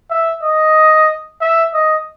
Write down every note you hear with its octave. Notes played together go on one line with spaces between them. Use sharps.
E5
D#5
E5
D#5